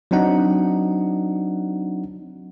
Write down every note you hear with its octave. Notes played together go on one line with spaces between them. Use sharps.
F#3 C4 D4 D#4 F#5